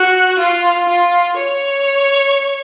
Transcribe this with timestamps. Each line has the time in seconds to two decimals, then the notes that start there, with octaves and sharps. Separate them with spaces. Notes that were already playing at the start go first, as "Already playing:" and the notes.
Already playing: F#4
0.39 F4
0.89 F4
1.38 C#5